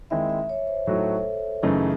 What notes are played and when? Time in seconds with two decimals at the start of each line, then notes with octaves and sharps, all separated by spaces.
0.10 D#2 D#3 G#3 C4 E4 E5
0.29 E5
0.49 C#5
0.67 C5
0.87 A2 F#3 A3 D#4 F#4 A4
1.62 F#2 C#3 E3 A3 D#4 G#4